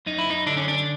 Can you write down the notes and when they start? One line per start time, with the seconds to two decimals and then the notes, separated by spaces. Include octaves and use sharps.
0.06 F#2 D#4
0.18 E4
0.30 D#4
0.46 D3 D4
0.57 C#4
0.68 D4